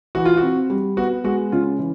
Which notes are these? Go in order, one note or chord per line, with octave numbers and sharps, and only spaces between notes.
E3 F#4
F4
C4 F#4
G3
B3 F#4
G#3 F#4
C#3 F4
E3